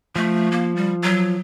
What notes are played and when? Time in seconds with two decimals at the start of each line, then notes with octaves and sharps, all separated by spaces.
0.16 F3 A3
0.52 A#3
0.76 G3
1.03 F#3